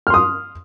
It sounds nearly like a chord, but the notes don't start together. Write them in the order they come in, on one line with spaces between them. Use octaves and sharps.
F6 C6 D#6